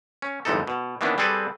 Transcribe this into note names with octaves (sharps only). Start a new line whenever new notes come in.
C#4
G1 F2 G#2 E3 D#4 A4
B2
D#3 E3 A#3 B3 C#4 D4
G3 C4 G#4 A4 B4 D5